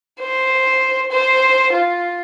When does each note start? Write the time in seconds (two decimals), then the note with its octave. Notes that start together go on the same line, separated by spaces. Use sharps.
0.21 C5
1.11 C5
1.73 F4